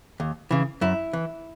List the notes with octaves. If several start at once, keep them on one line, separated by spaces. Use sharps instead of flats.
D#2
C#3 E3
F#2 E4
E3